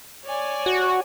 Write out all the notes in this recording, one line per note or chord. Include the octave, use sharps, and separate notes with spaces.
C#5 D5 G#5
F#4